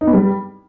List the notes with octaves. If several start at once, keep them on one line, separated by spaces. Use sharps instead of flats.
D#4
B3
G3